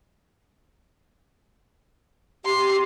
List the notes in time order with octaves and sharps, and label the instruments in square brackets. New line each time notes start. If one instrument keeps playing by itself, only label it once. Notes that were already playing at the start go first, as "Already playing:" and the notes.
[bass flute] G4 [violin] C6